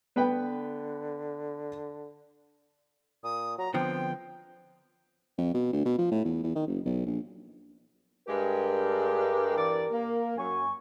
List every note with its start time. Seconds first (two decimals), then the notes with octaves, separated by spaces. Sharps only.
0.16 D3 B3 B4 G5
3.24 A#2 D#6
3.58 F#3 A#5
3.74 D3 F3 B3 C4 G5
5.38 F2
5.54 B2
5.73 D2
5.85 B2
5.98 F3
6.11 A2
6.25 E2
6.43 E2
6.56 D#3
6.67 F#1
6.85 B1
7.06 A#1
8.28 G2 G#3 G4 A#4
9.56 E2 E3 D5
9.91 A#3
10.37 F#2 G#5 C#6